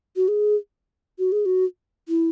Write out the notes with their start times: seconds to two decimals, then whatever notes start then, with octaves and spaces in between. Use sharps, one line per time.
0.16 F#4
0.28 G#4
1.19 F#4
1.32 G#4
1.46 F#4
2.09 E4